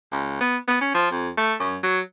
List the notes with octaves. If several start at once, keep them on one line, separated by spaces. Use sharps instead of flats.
C#2
B3
B3
C#4
F3
F2
A3
F#2
F#3